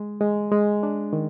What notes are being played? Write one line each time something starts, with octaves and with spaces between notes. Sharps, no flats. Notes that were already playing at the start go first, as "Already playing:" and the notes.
Already playing: G#3
G#3
G#3
D4
D#3